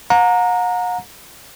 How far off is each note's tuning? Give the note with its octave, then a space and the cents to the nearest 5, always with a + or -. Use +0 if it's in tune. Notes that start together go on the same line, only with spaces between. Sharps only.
F#5 -45 A#5 -5